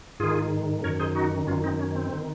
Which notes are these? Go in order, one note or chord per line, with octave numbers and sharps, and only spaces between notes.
G#2 D#3 F4 G#4
F#2 D#3 A#4 C#5
G#4 C5
D#4 F#4
F#2 D#3 C#4 F4
C4 D#4
C#4
C4
D#3